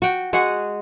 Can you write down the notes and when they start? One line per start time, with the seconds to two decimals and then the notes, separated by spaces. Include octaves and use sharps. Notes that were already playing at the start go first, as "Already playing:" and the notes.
0.02 F#4 G5
0.33 G#3 F#4 G#4 F#5